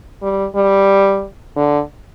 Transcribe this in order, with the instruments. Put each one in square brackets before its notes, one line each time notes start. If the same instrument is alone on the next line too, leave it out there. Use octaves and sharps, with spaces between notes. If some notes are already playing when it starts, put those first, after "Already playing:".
[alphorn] G3
G3
D3